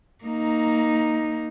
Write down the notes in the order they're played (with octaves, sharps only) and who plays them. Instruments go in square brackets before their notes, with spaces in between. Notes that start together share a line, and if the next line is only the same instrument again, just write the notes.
[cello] A#3 D#4